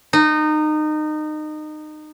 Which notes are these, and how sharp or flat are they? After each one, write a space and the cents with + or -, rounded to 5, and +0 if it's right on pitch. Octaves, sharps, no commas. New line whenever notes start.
D#4 -25